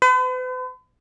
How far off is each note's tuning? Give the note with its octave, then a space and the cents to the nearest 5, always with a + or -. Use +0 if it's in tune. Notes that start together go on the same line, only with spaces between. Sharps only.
B4 +45